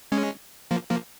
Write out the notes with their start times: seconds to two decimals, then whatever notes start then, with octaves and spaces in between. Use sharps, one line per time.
0.12 G#3 C#4
0.71 F3 A#3
0.90 F3 A#3